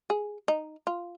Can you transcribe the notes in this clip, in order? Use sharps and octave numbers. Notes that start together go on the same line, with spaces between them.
G#4
D#4
F4